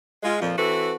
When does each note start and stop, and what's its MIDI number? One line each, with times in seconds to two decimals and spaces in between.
0.23 0.40 56
0.23 0.40 65
0.41 0.53 41
0.41 0.53 46
0.41 0.53 53
0.57 0.94 52
0.57 0.94 60
0.57 0.94 66
0.57 0.94 69
0.57 0.94 71